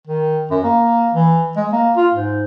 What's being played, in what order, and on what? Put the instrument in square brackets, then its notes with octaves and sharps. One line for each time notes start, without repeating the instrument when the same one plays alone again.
[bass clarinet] D#3
F#2
A#3
E3
G#3
A#3
F4
G#2